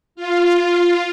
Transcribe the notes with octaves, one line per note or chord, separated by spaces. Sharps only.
F4